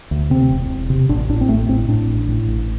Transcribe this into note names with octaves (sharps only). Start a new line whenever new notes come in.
D2
C3 C4
E1
E1
C3
A1 D4
A2 D4
C4
A1 A3
A2 C4
A2 D4
A1
A2
A1